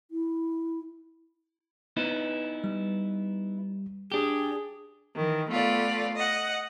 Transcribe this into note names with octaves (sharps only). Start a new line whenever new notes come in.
E4
B3 D#4 E4
G3
D4 G4 G#4
D#3 E3
A3 B3 F4 D5
D#5 F#5